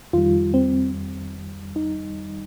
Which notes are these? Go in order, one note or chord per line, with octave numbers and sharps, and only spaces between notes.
F2 D#3 G3 F4
C4
D#4